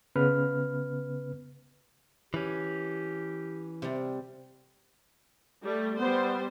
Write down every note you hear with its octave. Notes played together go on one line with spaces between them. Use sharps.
C#3 B3 B4 F6
E3 C#4 G4
C3 G3
G3 A3
G3 B3 C5